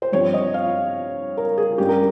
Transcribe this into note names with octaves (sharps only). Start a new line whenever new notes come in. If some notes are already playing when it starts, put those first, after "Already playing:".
C5
G2 F3 C4 C#5
D#5
F5
A#4
G#4
G2 G3 C#4 G4
A#4